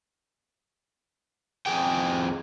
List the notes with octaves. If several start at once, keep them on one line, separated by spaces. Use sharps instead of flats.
F2 F3 G#4 G5